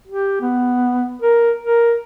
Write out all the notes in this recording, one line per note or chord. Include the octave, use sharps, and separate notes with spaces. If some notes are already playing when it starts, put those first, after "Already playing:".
G4
B3
A#4
A#4